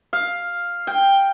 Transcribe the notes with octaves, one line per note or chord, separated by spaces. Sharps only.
F5
G5